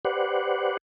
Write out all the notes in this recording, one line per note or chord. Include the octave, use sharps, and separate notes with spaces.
G4 B4 C5 D5 F#5